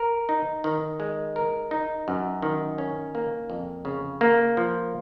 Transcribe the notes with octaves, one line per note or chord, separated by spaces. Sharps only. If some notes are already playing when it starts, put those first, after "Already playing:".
Already playing: A#4
D#4
D#3
G#3
A#4
D#4
F#2
D#3
C#4
A#3
F2
C#3
A#3
F3